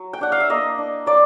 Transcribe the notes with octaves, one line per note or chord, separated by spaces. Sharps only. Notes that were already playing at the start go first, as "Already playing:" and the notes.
Already playing: F#3
G5
D4 F#5
F5
E5
A#3 D#5
D4
A#3 D5